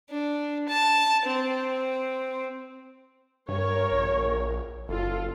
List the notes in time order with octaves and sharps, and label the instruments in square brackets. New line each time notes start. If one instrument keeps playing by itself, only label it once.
[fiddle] D4
A5
C4
[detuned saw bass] G2 [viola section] A#4 C#5
[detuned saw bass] A#1
[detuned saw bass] F#1 [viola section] F4 A4